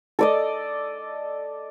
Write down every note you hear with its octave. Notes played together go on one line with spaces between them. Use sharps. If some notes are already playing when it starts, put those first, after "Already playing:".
A4 D5 D#5